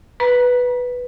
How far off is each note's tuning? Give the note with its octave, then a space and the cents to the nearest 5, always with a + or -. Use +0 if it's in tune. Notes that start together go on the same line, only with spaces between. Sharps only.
B4 +0 A#5 +45